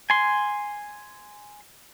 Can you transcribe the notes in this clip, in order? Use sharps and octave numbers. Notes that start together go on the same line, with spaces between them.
G#5 C6